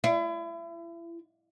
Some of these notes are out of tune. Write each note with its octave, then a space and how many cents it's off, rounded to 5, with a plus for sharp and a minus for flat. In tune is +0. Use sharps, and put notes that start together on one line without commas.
E4 +35